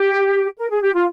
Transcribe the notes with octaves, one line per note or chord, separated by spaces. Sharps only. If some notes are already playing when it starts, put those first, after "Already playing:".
Already playing: G4
A#4
G#4
G4
F4